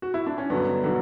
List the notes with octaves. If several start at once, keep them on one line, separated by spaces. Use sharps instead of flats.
F#4
E4
D4
C#4
G2 D3 F#3 B3
D3 F#3